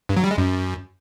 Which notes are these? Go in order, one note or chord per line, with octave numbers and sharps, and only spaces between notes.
G2
F#3
G3
G#3
F#2